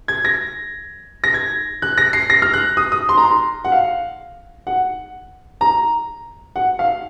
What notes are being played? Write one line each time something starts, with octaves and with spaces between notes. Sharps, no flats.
G#6
A#6
A#6
G#6
F#6
A#6
C7
A#6
F6
F#6
D#6
D#6
C6
A#5
C6
F#5
F5
F#5
A#5
F#5
F5